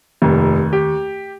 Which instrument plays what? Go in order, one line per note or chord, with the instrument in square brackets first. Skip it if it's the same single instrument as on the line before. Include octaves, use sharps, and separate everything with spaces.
[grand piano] F1 [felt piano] D#2
[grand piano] G4